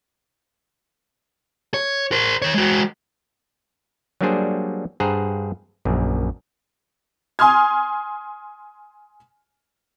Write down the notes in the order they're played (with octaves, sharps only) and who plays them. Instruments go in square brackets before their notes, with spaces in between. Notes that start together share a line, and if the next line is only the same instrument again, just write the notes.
[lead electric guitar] C#5
A#4 C5
D#3 C#5
G#3 F#4
[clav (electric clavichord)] F#3 G3 A#3 D4 G#4 C5
G2 G#4 C5 F#5 A#5
A#1 F#2
[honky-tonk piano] G#5 C6 D#6 F6 G#6